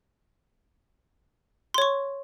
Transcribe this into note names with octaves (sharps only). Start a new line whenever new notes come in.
C#5 C6 C#6